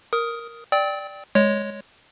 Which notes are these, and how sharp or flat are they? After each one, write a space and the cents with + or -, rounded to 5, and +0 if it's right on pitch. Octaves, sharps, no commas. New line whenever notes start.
A#4 +0 D#6 +10
D5 +0 G5 +0 E6 -40
G#3 +0 C#5 +0